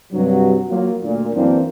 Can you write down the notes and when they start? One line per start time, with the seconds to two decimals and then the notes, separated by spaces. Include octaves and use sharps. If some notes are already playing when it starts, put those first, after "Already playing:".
0.13 G2 C3 F#3
0.69 F#3 A#3 F4
1.02 D2 A#2
1.34 F#2 E3 A#3 C4 D4